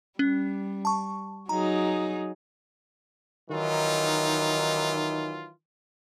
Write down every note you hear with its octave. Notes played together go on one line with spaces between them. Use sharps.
G3 C#4
A5 C#6
F#3 D#4 G#4 A#5
D#3 E3 F#3 D#4 F4